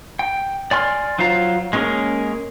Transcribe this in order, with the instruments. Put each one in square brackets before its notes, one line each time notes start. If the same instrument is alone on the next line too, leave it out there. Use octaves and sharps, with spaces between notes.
[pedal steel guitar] G5
D5 G#5 C6 F6
F#3 F4 C5 F5 A#5
G#3 A#3 C#4 G#4 A#4